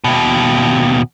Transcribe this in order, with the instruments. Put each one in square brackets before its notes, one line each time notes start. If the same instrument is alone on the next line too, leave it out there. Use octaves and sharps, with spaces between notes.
[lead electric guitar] D#2 B2